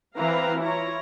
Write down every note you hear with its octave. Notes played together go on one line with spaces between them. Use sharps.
E3 C4 B4 F5 A#5
E4 F4 C#5 A#5